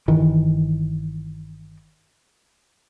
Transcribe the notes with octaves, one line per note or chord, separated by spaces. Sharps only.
G1 D#3 E3